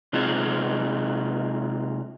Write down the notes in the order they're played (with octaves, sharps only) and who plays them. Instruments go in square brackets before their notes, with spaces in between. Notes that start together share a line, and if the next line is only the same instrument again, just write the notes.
[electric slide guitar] C3 G#3 C4 D#4 F4 G#4